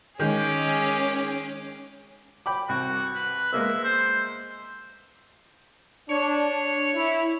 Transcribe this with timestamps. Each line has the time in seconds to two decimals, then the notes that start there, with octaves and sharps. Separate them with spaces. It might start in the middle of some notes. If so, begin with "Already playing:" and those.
0.19 D#3 G#3 C#4 G#4 D6
2.46 G5 B5 D6
2.69 C2 F#4
3.15 B4
3.52 G#3 A#3 B3 E5
3.84 C5
6.10 D4 C#5
6.95 E4